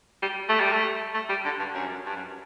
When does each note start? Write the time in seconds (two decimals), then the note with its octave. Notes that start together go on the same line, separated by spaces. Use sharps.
0.22 G3
0.49 A3
0.60 G3
0.73 A3
1.14 A3
1.29 G3
1.45 D3
1.59 G2
1.75 F#2
2.06 G2
2.16 F#2